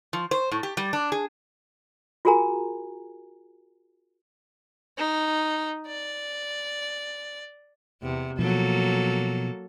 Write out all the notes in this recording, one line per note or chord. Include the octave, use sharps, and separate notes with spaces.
F3
C5
A2
G4
G3
D4
G#4
F4 F#4 G#4 A#4 G#5 A#5
D#4
D5
E2 C3
B2 F3 F#3 A#3 A4